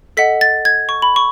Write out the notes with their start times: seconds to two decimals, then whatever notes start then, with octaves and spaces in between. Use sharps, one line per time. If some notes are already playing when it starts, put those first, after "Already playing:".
0.17 A4 D#5 F#5 B6
0.41 A6
0.65 G#6
0.89 C#6
1.02 B5
1.16 C#6